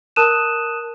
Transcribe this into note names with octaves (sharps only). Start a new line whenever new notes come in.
A#4 A5 D#6 F#6 D#7 E7